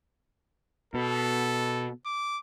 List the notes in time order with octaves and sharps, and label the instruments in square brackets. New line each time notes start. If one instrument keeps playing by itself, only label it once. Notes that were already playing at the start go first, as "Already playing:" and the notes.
[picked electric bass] B2 [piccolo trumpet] A4
[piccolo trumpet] D6